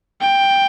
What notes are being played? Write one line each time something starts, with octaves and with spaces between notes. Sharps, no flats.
G5